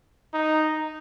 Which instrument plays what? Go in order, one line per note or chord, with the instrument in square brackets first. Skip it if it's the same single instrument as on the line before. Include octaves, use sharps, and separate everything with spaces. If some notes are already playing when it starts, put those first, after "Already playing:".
[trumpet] D#4